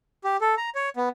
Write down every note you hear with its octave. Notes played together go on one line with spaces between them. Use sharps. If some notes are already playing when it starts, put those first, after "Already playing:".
G4
A4
A#5
C#5
B3